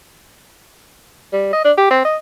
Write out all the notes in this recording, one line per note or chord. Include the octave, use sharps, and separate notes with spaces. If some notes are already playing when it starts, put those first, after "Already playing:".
G3
D#5
D4
G4
C4
D#5